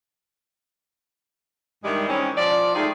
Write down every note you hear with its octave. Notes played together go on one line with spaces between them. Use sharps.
G2 D#3 E3 G3 G#3
D#3 E3 G#3 C4 C#4
F3 D5
D#3 G#3 A3 D#4 G4 G#4